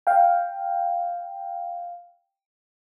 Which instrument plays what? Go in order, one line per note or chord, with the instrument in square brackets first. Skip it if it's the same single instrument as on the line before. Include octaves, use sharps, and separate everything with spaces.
[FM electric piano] F5 G5